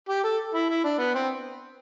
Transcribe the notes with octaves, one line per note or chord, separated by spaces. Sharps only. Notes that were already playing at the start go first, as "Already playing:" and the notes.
G4
A4
E4
E4
D4
B3
C4